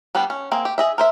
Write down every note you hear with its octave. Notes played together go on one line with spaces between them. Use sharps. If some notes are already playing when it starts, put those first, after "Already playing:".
G3 B3 D4 G4
C#4
A#3 C4 G#4
G4
G#4 D#5 E5
A#4 C5 E5